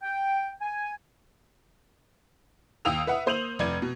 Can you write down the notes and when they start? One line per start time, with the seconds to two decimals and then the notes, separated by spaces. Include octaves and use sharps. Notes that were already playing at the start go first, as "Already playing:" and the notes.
0.03 G5
0.61 G#5
2.85 D#2 F5 G5 D#6 E6 F7
3.07 B4 E5 F#5
3.26 A#3 C5 G6 D#7 F7 F#7
3.59 F1 D5 G#6 D#7
3.82 B2